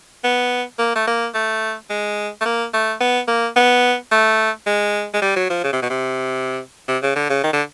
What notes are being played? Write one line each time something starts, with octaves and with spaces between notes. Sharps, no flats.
B3
A#3
A3
A#3
A3
G#3
A3
A#3
A3
B3
A#3
B3
A3
G#3
G#3
G3
F#3
F3
C#3
C3
B2
C3
C3
C#3
D3
C#3
D#3
D3